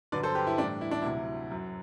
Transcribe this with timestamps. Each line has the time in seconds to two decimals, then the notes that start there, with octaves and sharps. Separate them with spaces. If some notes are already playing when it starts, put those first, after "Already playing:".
0.12 G2 D3 F#3 B4 D5
0.23 A4 C5
0.35 G4 B4
0.47 E4
0.58 A2 E3 G3 D4
0.81 E4
0.91 D4
1.02 D2 C3 F#3 E4
1.50 F#2 F#3